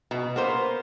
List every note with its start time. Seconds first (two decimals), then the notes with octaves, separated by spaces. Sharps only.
0.11 B2
0.36 A#3 B3 C5